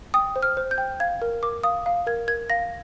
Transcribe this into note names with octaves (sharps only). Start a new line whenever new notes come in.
G5 D#6
C5
F6
C5
G6
G5
F5 G#6
A#4
A#4 D6
F5 D#6
F5
A#4 G#6
A#4 G#6
F5 A#6